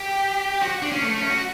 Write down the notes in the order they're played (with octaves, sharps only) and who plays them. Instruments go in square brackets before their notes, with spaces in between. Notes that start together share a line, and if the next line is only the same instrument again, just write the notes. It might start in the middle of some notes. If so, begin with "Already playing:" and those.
Already playing: [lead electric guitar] G4
F#4
D4
C#4
A3
C#4
F#4